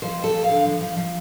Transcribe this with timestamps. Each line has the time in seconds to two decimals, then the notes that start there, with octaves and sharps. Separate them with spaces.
0.02 F3 C5
0.18 F2
0.24 A4
0.34 F3
0.44 F5
0.49 D3
0.65 F3
0.81 F3
0.97 F3